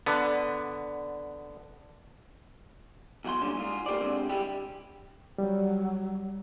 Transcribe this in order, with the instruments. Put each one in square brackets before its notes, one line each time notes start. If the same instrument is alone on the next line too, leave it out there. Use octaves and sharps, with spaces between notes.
[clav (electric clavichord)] D3 B3
[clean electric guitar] E2 F#3 F#5 C6
A#2 D3 G3 C#4
G#2 F4
A3 A#3 G4 C5 D5
D3 G#3 C4 G4
G3 G#3 E4 G4
[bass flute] F#3 [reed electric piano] G3